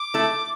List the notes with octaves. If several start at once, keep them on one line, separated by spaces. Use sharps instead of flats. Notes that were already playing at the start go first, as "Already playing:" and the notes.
Already playing: D6
A3 E4 A4